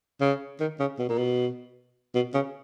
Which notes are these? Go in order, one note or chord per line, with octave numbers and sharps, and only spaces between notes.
C#3
D#3
C#3
B2
A#2
B2
B2
C#3